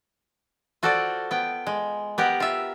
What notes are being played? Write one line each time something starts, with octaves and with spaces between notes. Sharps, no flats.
F4 F#4 A4 C5 D5
B3 G5
G#3
B3 G4 A#4 F#5
F4 E5